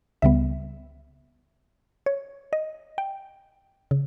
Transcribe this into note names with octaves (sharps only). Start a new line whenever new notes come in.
C#2 C#3 G3 B3 E5
C#5
D#5
G5
C#3